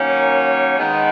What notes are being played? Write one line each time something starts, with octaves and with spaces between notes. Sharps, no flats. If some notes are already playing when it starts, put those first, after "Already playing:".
Already playing: D#3 F#3 A#3 C#4
D#3 G#3 B3